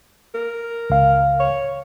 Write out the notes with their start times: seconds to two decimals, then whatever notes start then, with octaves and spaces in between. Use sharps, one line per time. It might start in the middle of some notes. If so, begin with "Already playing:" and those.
0.35 A#4
0.90 C#2 F5
1.40 C#5